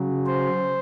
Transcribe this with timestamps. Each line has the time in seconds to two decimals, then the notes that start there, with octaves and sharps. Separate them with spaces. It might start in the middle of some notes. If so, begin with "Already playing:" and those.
Already playing: C#3 F#3
0.26 C5